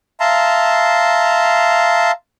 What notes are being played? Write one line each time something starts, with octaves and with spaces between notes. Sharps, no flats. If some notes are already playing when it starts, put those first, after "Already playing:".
E5 F5 A5 A#5 C6